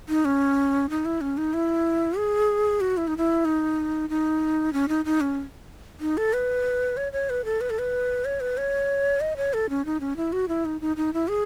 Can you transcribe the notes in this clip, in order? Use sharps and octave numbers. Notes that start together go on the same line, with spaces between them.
D#4
C#4
D#4
E4
C#4
D#4
E4
G#4
F#4
E4
D#4
E4
D#4
D#4
C#4
D#4
D#4
C#4
D#4
A4
B4
C#5
C#5
B4
A4
B4
A4
B4
C#5
B4
C#5
D#5
C#5
A4
C#4
D#4
C#4
E4
F#4
E4
D#4
D#4
D#4
E4
G#4